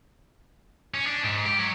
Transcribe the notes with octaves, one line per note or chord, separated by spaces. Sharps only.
C#4
D4
G#2
G4
F#3